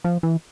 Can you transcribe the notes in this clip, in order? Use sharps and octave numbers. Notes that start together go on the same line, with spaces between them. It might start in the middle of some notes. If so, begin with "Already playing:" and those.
F3
E3